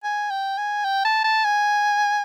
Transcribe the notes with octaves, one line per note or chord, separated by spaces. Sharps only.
G#5
G5
G#5
G5
A5
A5
G#5